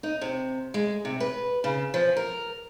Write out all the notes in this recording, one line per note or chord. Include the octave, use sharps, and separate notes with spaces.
D#4
C3
G#3
C3
B4
C#3
F3
A#4